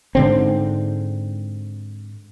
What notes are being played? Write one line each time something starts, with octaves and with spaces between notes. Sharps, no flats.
G#2 D3 C4